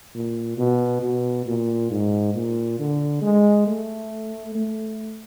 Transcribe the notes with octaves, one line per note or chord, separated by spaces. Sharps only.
A#2
B2
B2
A#2
G#2
A#2
D3
G#3
A3
A3